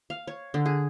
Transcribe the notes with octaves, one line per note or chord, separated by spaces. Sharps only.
F5
C#5
D3
G#4